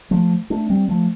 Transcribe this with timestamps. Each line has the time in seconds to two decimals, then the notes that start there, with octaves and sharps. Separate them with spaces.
0.11 F3 A3
0.50 A3 D4
0.70 G3 C4
0.89 F3 A3